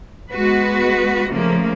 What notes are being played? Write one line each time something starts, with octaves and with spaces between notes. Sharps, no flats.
G#3 B3 F#4 B4
C#3 F3 A3 A#3